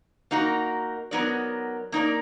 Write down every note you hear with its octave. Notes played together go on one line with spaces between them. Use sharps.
A#3 D#4 F#4 A#4
F#3 B3 D#4 A#4 D5
A#3 D#4 A#4 D5